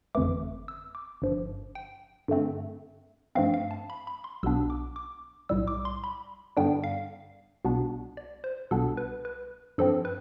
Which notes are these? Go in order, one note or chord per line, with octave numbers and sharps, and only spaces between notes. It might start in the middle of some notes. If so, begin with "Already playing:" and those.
G1 F2 E3 A3 D6
E6
D6
G1 G2 F3
G5
G2 D3 A3 C4
G2 F3 A3 C4 F5
F5
A5
B5
B5
C6
B1 B2 B3 D4 E6
D6
D6
B1 A2 G3 E6
D6
C6
B5
G2 D3 G3 B3 D4 G5
F5
C2 B2 B3 D4
D5
C5
C2 B2 B3 D4 A4
B4
B4
G2 F3 C4 A4
B4